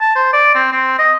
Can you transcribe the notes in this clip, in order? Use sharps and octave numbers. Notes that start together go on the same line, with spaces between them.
A5
C5
D5
C4
C4
D#5